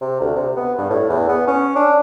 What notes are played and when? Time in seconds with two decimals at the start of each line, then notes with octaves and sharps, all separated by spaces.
0.01 C3
0.21 D2
0.36 C3
0.56 B3
0.78 G2
0.90 A2
1.09 E2
1.28 B3
1.47 C#4
1.76 D4